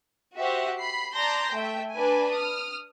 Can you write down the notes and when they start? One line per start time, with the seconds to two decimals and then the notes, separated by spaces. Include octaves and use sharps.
0.36 F#4 G4 C5 E5 F#5
0.81 B5 C7
1.15 D5 A5 A#5 C6 G6 A#6
1.54 A3 E5 G5
1.93 D4 B4 G#5
2.32 D#6 F6